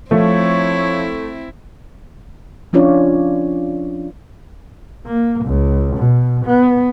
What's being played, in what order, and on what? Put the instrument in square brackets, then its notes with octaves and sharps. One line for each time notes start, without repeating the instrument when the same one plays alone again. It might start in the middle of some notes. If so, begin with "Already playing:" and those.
[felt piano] F3 [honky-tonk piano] A3 [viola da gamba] C4 E4 [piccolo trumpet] C#5
[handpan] F3 C#4 D4 F4 C#5 D5
[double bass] A#3
C#2
B2
B3